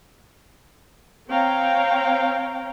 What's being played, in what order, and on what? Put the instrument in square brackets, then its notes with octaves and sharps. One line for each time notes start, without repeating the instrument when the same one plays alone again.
[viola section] C4 C#5 F5 G5 A#5